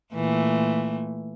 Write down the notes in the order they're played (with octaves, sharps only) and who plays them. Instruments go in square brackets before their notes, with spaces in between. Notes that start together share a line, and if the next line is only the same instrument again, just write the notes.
[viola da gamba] A#2 E3 A3